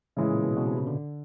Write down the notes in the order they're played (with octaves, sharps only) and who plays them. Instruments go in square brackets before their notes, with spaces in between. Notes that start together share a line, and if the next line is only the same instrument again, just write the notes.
[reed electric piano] A2 [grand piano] C#3 E3 G#3
[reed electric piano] A#2
B2
B2
C3
C#3
D3